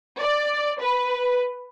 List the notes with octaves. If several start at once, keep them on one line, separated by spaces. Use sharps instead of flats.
D5
B4